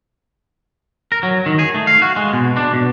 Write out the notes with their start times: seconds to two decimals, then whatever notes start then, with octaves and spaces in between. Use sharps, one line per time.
1.12 A#4
1.23 F#3
1.46 D#3
1.59 G#4
1.74 A3
1.87 F5
2.02 F#4
2.16 G#3
2.33 B2
2.57 D4
2.73 B2